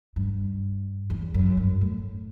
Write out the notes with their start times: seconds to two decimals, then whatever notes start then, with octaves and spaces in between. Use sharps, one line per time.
0.16 G2
1.10 E2
1.34 F#2
1.57 G2
1.81 A2